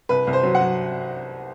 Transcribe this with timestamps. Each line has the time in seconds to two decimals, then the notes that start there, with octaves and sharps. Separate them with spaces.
0.09 C2 B4
0.27 C2
0.33 C5
0.43 F#3
0.55 F#5
0.61 F#3